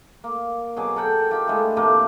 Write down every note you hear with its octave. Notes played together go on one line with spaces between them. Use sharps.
A#3
B2 F#3 G#4 D6
A4 A#4 F#5 G5
D#4 F4 G4 G5
G#3 A3 D4 E4
A2 C3 F3 A#3